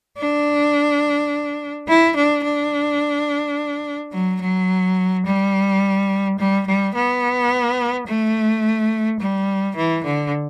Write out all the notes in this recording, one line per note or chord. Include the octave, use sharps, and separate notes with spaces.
D4
E4
D4
D4
F#3
F#3
G3
G3
G3
B3
A3
G3
E3
D3